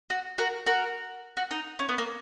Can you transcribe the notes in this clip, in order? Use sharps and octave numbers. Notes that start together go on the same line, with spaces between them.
F#4
F#4 A#4
F#4 A#4
F#4
D#4
C#4
B3
A#3